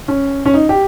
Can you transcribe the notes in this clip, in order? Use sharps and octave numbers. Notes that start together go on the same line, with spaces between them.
C#4
C#4
D#4
G4